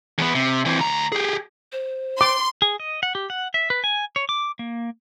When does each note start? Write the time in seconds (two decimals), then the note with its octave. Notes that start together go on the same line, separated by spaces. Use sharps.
0.18 E2 B3
0.35 C3
0.65 E3 C4
0.79 D2 A#5
1.12 G4 G#4
1.72 C5
2.21 C6 D6
2.62 G#4
2.80 D#5
3.03 F#5
3.15 G4
3.30 F#5
3.54 E5
3.70 B4
3.84 G#5
4.16 C#5
4.29 D6
4.59 A#3